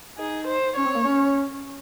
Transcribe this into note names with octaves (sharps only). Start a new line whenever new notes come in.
D#4 G#4
C5
C#4 C#5
C4
A#3
C#4